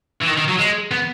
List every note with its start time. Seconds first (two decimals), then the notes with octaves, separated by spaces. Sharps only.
0.21 E3
0.27 D#3
0.37 D#3
0.48 F#3
0.59 G#3
0.91 B3